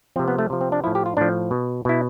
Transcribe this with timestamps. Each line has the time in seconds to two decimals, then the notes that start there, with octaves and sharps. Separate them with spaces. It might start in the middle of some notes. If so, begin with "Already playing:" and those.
0.16 F3 C4
0.19 C3
0.28 B3
0.39 A3
0.50 C3 F3
0.61 C4
0.72 D4
0.84 A2 F3 E4
0.95 G4
1.06 F4
1.17 A2 F3 D4
1.51 B2
1.85 B2 E4